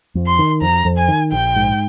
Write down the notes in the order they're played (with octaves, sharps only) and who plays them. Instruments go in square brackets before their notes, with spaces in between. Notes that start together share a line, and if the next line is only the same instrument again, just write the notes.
[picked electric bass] F2
[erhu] C6
[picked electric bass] D#3
[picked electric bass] F2 [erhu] A#5
[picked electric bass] F2
[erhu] G#5
[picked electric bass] D#3
[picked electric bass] A#1 [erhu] G5
[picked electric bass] G#2